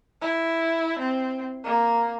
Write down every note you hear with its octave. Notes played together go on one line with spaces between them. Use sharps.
E4
C4
A#3